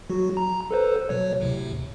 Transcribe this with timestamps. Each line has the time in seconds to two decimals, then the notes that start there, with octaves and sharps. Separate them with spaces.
0.10 F#3 F#4
0.37 A#5
0.71 A4 B4 C5
1.09 B2 F#3 C#5
1.41 D2 A2 C3